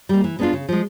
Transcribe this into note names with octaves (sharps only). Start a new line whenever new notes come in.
G3 A#3
E3
G#3 B3 D4 F4
C#3
F3 G#3